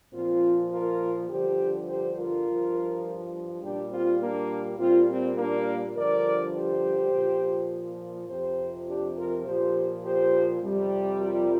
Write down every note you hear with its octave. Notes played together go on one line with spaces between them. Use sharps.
A#2 F3 C4 F4
F4 A#4
G2 D3 F3 G4 C5
G4 C5
F4 A#4
G2 F3
A#2 G3 D4 G4
C4 F4
A#3 D4
A#2 G3 C4 F4
C4
A#3 D4
G2 D3 F3 A#4 D5
G4 C5
A#2 F3
F2 C3 F3 G4 C5
D4 G4
F4 A#4
A#2 F3 G4 C5
G4 C5
F2 C3 G3
F4 A#4